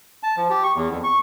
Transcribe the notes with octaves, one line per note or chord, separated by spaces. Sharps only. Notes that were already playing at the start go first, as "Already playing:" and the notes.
A5
F3
G4
C#6
E2
F2
C#6